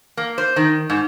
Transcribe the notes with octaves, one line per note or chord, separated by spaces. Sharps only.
A#3
C5
D#3
G#2